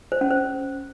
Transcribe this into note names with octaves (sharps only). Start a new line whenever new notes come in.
C5
C#4
C5